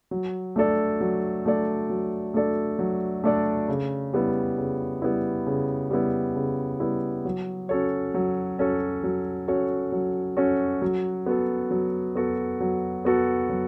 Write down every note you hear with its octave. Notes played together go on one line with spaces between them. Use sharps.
F#3
A3 D4 A4 D5
F#3
A3 D4 A4 D5
F#3
A3 D4 A4 D5
F#3
A3 D4 A4 D5
C#3
G3 B3 E4
C#3
G3 B3 E4
C#3
G3 B3 E4
C#3
G3 B3 E4
F#3
C#4 F#4 A4 C#5
F#3
C#4 F#4 A4 C#5
F#3
C#4 F#4 A4 C#5
F#3
C#4 F#4 A4 C#5
F#3
B3 F#4 A4
F#3
B3 F#4 A4
F#3
B3 F#4 A4
F#3